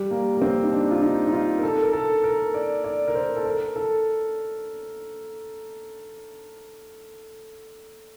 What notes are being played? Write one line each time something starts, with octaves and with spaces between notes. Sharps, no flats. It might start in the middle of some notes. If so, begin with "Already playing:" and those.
Already playing: G3
A#3
A#3
C4
D#4
D4
F4
D#4
D#4
F4
A#4
A4
A#4
A4
A#4
D5
D5
A#4
C5
A4
A#4
A4